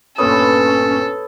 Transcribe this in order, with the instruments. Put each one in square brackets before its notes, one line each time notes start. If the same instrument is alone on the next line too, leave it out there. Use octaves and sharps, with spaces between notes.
[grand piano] G1 A#2 D#6 [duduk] C#4 [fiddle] A4 [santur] B4 C#5